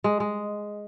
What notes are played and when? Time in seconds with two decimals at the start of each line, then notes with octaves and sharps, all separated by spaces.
0.04 G#3
0.20 G#3